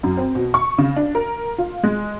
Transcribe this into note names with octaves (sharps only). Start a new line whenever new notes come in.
F#2
C4
B2
C#6
C#3
D4
A#4
F4
G#3